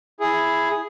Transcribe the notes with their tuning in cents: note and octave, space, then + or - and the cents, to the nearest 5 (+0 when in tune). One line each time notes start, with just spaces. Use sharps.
E4 +0 G#4 +0